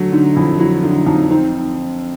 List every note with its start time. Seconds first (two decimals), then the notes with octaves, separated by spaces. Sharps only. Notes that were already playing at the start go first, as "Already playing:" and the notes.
Already playing: D3 F#3 A3
0.12 D3 D#4
0.36 F2 E4
0.59 F#3 E4
0.83 D3 D#4
1.06 F2 D#4
1.30 C4 D#4